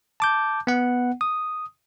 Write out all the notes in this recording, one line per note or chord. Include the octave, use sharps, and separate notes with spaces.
A5 D6 G6
B3 F#5
D#6